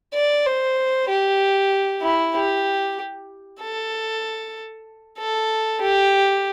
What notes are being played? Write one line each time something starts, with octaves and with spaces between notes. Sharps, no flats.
D5
C5
G4
E4
G4
A4
A4
G4